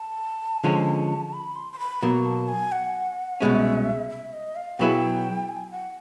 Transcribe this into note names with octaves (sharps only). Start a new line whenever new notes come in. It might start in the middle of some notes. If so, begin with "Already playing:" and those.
Already playing: A5
D3 F3 G#3 C#4
B5
C6
C6
B5
B2 F#3 A#3 A#5
A5
G#5
F#5
C2 B2 G#3 C#4 E5
E5
D#5
F5
B2 F#3 B3 E4 G#4 G5
G#5
F#5